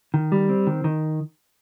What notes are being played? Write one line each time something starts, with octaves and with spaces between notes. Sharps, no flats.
D#3
G3
C4
D#3
D#3